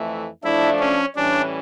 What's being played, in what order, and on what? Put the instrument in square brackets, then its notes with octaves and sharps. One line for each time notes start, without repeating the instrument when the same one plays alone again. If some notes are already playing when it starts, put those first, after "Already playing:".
Already playing: [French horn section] F2 E3 A3
[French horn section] F3 A3 D4 [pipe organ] E4
[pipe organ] C#4
[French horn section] A2 E3 G3 C#4 [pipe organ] D4